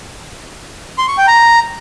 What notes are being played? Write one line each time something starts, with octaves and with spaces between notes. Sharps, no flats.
C6
C#6
G5
A#5